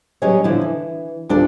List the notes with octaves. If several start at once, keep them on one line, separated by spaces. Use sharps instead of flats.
F#3 G3 C#4 G#4 C#5 D#5
D3 F3 E4
E3
D2 D4 F4 A4